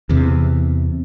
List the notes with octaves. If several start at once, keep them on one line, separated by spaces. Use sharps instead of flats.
E2 C3